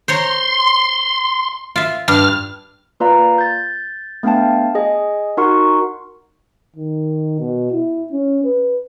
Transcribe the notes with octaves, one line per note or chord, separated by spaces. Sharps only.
C5 C#5 A#5 C6
F4 E5
G2 F6
A#3 F4 B4 D5 F5 A#5
G6 A6
A3 B3 D4 F5 G5 A5
G#4 D#5 G#5
D#4 F#4 A#4 F#5 C6 C#6
D#3
B2
E4
C#4
B4